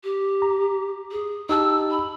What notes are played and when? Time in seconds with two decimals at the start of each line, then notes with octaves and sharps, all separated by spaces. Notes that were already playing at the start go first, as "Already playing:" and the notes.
0.04 G4
0.42 A#5
1.11 G#4
1.49 D#4 G4 A5 E6
1.91 B5